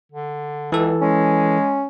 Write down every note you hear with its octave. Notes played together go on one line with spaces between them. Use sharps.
D3
C#2 E3 A4
G#3 C#4